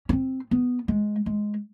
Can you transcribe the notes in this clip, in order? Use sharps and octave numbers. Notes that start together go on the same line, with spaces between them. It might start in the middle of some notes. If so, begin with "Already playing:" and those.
C#4
C4
B3
G#3
G#3